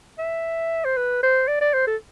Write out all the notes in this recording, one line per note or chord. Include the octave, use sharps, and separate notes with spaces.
E5
C5
B4
C5
D5
D5
C5
A4